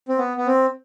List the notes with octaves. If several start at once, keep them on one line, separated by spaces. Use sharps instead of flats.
C4
B3
B3
C4